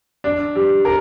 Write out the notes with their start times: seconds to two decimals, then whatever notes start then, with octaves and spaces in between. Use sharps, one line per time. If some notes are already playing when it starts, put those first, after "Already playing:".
0.24 D4
0.55 G3
0.85 A#4